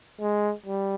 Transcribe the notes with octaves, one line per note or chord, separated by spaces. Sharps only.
G#3
G3